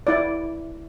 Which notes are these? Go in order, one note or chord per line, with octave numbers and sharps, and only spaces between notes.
E4 D5